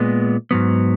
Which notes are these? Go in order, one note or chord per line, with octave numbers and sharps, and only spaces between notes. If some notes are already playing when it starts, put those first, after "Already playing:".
Already playing: A#2 G#3 B3
G#2 F#3 B3